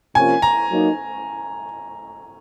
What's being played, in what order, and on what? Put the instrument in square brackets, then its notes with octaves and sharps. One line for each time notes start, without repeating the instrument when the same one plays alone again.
[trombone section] C3 F3 A#3 C#4 F4 [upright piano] G#5
[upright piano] A#5
[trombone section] F#3 A#3 D#4